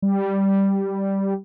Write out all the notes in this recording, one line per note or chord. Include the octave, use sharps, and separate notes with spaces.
G3